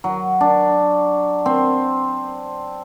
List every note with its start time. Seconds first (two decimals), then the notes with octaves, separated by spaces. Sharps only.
0.04 F#3
0.41 D4
1.46 C4